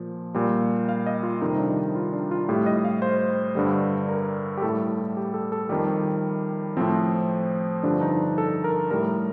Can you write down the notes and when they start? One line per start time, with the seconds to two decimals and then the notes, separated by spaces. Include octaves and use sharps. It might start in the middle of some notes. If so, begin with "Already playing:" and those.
Already playing: A#2 F3
0.34 A#2 G3
0.89 F5
1.06 D#5
1.23 F4
1.41 F2 C3 D#3 G3 D#4
1.59 D4
1.95 F4
2.13 D4
2.31 F4
2.49 A2 G3 G4
2.66 D#5
2.85 F5
3.02 C5
3.55 G2 D3 G3
4.09 A#4
4.57 G4
4.62 A2 G3 A4
5.17 G4
5.34 A4
5.52 A4
5.69 F2 D#3 G3 G4
6.77 A2 F3 C4
7.83 G2 D3 F3 D4
8.01 D#4
8.38 A4
8.64 A#4
8.91 A2 G3 A#4